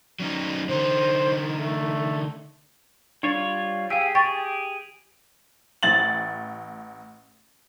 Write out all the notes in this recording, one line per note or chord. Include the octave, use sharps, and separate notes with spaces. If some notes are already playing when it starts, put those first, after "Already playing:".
F#3 C#4 D#4
D3 D#4 C5
A3
G3 D4 F4 C#5
G4 G#4 F5 E6
G4 G#4 G5 C#6 A6
A1 A6 F#7